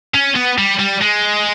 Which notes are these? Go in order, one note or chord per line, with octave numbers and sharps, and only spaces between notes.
C#4
B3
G3
G3
G#3